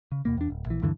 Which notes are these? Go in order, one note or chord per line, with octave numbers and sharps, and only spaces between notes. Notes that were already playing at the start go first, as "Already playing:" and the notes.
C#3
D#2 B2 A#3
E2 D4
D1
A#1 E3
D2 G2 D3 E3